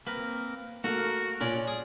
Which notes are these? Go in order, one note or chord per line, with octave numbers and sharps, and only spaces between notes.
A#3 C4 A#4 B4
A3 A#3 F#4 A#4
A#2 C#4 D5
G#4